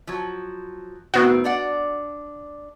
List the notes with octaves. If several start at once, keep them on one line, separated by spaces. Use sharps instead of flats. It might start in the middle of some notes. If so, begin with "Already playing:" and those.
F3 F#3
A2 D#3 B3 C4 F#4
D4 D5 F#5